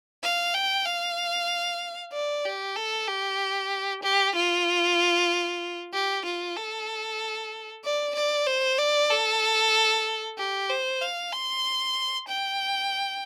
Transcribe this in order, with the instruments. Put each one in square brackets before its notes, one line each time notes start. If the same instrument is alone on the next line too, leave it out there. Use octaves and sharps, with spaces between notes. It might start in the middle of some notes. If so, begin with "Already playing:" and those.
[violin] F5
G5
F5
D5
G4
A4
G4
G4
F4
G4
F4
A4
D5
D5
C5
D5
A4
G4
C5
F5
C6
G5